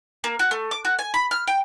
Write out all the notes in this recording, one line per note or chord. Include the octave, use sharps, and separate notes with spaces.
A#3
F#4
A3
D6
F#4
G#5
B5
F6
G5